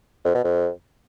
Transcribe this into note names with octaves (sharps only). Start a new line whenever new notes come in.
F2
B2
F2